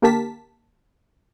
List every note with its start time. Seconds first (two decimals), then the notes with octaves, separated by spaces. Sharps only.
0.02 D3 A#3 G4 A#4 A5 B6